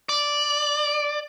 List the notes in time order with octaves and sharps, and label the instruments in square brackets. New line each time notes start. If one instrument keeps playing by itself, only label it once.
[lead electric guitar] D5